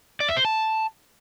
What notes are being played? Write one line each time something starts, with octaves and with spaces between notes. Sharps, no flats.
D5
E5
C5
A5